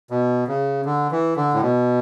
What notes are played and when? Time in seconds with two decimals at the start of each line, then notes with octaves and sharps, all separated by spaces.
0.10 B2
0.47 C#3
0.85 D3
1.11 E3
1.36 D3
1.54 A2
1.62 B2